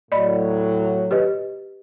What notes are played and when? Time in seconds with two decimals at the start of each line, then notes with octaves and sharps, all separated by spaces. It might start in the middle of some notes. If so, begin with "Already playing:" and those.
0.12 A2 F#3 D5 D#5 B5
1.11 G4 B4 D#5